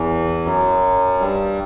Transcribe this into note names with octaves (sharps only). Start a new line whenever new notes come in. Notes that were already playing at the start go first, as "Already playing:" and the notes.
Already playing: E2 E3
F#2 F#3
G2 G3